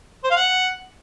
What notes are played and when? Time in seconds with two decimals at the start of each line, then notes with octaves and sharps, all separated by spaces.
0.24 C5
0.31 F5
0.37 F#5